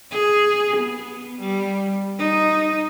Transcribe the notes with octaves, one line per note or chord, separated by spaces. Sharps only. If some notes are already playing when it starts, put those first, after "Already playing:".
G#4
B3
G3
D#4